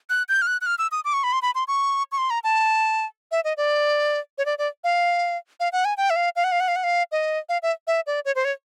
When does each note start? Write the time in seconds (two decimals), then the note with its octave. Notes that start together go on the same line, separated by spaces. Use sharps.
0.10 F#6
0.29 G6
0.42 F6
0.47 F#6
0.61 F#6
0.66 F6
0.78 E6
0.92 D#6
1.05 D6
1.13 C#6
1.24 B5
1.33 C6
1.42 B5
1.55 C6
1.68 C#6
2.12 C#6
2.18 C6
2.30 A#5
2.44 A5
3.31 E5
3.44 D#5
3.57 D5
4.38 C#5
4.46 D5
4.59 D5
4.84 F5
5.60 F5
5.73 F#5
5.85 G#5
5.97 G5
6.10 E5
6.16 F5
6.36 F5
6.44 F#5
6.52 F5
6.60 F#5
6.68 F5
6.76 F#5
6.84 F5
7.12 D#5
7.49 F5
7.63 E5
7.87 E5
8.07 D5
8.25 C#5
8.35 C5
8.45 C#5